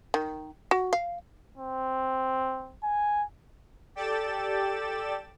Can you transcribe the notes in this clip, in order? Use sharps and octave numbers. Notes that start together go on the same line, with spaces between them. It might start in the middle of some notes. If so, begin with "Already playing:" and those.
D#3
F#4
F5
C4
G#5
G4 A4 D5 G5 A6 E7